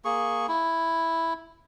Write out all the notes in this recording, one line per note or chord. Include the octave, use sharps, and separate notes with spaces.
A#3 G#4 C#6
E4